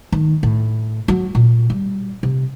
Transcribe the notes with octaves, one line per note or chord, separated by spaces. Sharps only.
D#3
A2
F#3
A#2
G3
C3